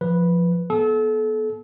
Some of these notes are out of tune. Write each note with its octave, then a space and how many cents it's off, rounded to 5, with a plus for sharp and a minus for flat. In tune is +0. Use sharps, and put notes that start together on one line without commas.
F3 +0 B4 -5
B3 -25 A4 -30